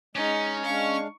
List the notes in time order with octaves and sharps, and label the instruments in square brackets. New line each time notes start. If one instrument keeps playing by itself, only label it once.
[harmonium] G#3 [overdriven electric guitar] C#4 [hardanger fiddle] D#4
[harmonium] G#3 D4 F5 [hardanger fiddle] C#6